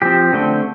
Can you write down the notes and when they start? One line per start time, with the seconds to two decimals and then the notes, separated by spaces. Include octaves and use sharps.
0.02 F3 C4 G4
0.33 D3 A3 C4